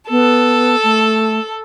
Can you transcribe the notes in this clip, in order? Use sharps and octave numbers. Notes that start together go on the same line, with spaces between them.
B3 A4
A3